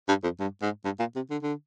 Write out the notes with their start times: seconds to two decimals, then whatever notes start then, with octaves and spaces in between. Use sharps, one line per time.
0.08 G2
0.23 F2
0.40 G2
0.62 G#2
0.85 G2
0.99 A#2
1.16 C3
1.30 D3
1.42 D3